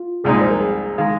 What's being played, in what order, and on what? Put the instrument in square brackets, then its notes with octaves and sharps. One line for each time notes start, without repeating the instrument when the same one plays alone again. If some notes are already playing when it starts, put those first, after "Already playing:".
Already playing: [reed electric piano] F4
[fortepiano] C2 A#2 G#3 D#4 [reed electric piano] G#4
[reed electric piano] C5
A#4
G#4
[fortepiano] D#3 G#3 [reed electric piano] F5